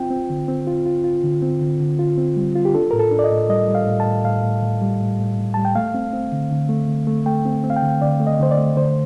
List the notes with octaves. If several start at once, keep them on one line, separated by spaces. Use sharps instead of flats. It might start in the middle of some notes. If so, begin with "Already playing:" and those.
Already playing: C4 F4 G5
C4
D3
C4
F4
F4
F4
D3
C4
D3
D3
F4
C4
G3
F4
G4
D4 A4
A2 A#4
A4
D4
D5
D#5
A2
G3 D#5
G3
F5
A2
A5
A2
A2 F5
A2
A2
G3
A2
A2
A2
G3 A5
G5
A3 F5
C4
C4
D3
D3
A3
D3
A3
A3 G5
C4
C4
F5
G5
D3
D3 D5
A3
D#5
D3 C5
D5
A3
D3 C5